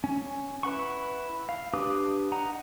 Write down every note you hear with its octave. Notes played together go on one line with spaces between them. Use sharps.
C#4
E4 B4 F#5 C#6
F5
D4 G4 B4 D6 D#6
D#4 F#5 A#5